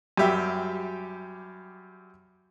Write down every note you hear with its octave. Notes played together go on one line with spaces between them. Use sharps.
F#2 G3 G4 E5